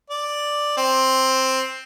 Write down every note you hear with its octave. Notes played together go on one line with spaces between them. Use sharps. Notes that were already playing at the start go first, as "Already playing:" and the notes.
D5
C4